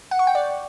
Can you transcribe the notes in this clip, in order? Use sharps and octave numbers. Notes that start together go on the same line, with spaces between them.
F#5
C#6
G5
D5